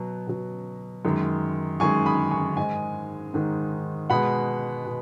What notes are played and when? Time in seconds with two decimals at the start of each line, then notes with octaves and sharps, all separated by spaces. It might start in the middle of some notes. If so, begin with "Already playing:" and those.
Already playing: B2 F#3
0.27 B2 F#3
1.05 F#2 D#3 G#3
1.80 F#2 D#3 G#3 G#5 C#6
2.06 B5 D#6
2.31 G#5 C#6
2.57 G#2 D#3 G#3 D#5 G#5
3.34 G#2 D#3 G#3
4.10 B2 G#3 F#5 B5
4.86 B2